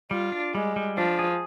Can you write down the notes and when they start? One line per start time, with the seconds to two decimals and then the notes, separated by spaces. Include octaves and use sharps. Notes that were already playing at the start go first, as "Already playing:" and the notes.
0.11 G3 F4
0.32 D4
0.54 G3 G#3
0.76 G3
0.97 F3 D4
1.19 G#4